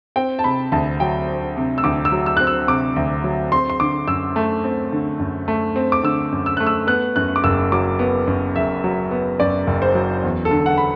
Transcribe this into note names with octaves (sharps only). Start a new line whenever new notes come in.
C4 G5
A5
C3 B5
D2 A5
F#3 G5
C4
C3
E6
D2 D6
E6
F#3
E6
C4 F#6
E6
C3 D6
D2
F#3
C4 C6
C6
D3 D6
F#2 E6
A3
C4
D3
F#2
A3
C4
D6
D3 E6
F#2
E6
A3 F#6
E6
B3 F#6
F#2 F#6
D6
F#1 E6
F#3 D6
B3
F#2
F#1 E5
F#3
B3
F#2 D5
F#1
C5
F#3
E2
A4
D3
F#5
B5